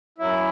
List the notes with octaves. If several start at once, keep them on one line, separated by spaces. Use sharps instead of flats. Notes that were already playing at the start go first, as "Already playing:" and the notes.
F#2 F#3 E4